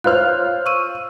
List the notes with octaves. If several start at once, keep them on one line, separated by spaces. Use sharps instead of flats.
F4 C5 C#5 F6 F#6
C#6 E6 D#7